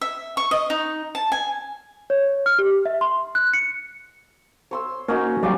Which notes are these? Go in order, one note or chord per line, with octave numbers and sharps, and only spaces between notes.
E5
C#6
D#5
D#4
A5
G#5
C#5
F6
G4
E5
C6
F#6
C#7
C#5 C6 E6
A#3 C#4 D#4 F#4
F#3 G3 D5 F5 G#5